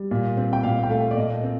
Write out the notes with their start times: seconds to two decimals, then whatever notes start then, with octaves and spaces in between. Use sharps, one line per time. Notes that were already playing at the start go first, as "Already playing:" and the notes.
Already playing: G3
0.11 A#2
0.37 C4
0.53 G5
0.63 A#2 F5
0.83 G5
0.90 A3 F5
1.11 D5
1.17 A#2 D#5
1.44 C4